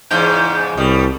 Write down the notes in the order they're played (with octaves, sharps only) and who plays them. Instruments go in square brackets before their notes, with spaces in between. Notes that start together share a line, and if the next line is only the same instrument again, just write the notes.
[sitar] E2 G#2 C#3 [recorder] G6
[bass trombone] C2 [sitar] B2 G3 [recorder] D#6